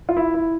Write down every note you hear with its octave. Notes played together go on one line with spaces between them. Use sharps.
F4
E4
E4